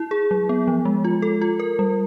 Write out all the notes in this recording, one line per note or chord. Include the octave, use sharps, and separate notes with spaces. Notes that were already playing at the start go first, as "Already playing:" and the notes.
Already playing: E4
G#4
F#3
B3
F3
G#3
F4
A4
F4
A#4
G3